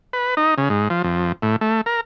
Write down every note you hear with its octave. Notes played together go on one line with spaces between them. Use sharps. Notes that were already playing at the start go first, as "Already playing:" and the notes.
B4
D#4
C#3
G#2
F3
F2
A2
A3
A#4